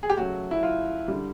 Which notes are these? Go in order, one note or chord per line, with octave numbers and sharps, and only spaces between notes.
G#4
G4
C#3 F#3 A3 F#4
E4
F4
D3 G3